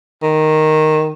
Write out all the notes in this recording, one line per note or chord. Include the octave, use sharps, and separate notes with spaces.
D#3